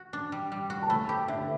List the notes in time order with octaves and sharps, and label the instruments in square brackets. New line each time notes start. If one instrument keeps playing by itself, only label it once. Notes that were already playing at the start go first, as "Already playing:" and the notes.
Already playing: [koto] F#4
D4
G3
G3
F#4
[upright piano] A5
[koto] A3 [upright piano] B5
[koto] G4
[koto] D3 [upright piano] E5